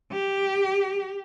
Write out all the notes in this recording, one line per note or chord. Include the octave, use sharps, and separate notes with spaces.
G4